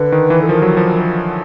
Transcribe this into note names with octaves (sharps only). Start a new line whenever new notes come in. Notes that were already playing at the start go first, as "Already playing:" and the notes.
Already playing: D3 B4
D#3
E3
A4
F3 A#4
F#3
F3